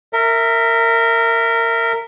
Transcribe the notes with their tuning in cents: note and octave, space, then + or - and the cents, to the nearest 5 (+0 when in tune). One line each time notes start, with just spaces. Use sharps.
A#4 -20 E5 +0